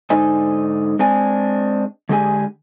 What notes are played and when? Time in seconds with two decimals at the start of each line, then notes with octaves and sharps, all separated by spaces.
0.10 G#2 D3 D#4 C5 D#5 G#5
0.99 G#3 C4 D4 G#5
2.09 D3 G#3 D4 G4 G#4 G#5